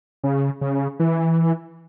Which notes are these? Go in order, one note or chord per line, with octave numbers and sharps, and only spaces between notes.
C#3
C#3
E3